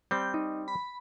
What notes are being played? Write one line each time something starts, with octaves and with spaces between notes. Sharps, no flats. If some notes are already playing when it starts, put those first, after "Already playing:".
G3 C4 G6
D#4
B5